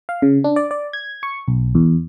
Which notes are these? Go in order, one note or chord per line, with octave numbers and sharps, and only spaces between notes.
F5
C#3
D4
D5
D5
G#6
C#6
B1
E2